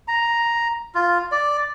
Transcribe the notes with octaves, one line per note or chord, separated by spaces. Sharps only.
A#5
F4
D5